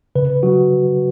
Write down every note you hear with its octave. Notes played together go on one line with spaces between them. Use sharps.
C#3 B4
F#3 F#4